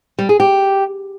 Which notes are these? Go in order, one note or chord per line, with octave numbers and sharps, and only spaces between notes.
G3
G#4
G4